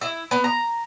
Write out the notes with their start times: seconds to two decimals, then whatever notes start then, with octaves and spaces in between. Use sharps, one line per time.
0.01 E4
0.31 B3
0.44 A#5